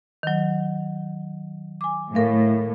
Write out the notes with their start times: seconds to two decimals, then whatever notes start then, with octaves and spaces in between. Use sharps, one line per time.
0.23 D#3 F#3
1.81 G#5 D6
2.15 A2 A#4 F5